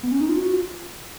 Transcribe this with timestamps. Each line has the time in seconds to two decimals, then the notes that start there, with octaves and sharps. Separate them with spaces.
0.03 B3
0.12 C#4
0.21 D#4
0.29 F4
0.38 F#4
0.53 F4